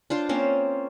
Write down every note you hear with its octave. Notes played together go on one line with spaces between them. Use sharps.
D4 F4 C5
A#3 C4 C#4 C5